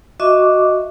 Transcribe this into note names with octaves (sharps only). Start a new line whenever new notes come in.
F#4 D#5 E5 C#6 D6